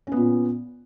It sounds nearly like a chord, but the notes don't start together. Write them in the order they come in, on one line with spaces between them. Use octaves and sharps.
C#4 B3 A#2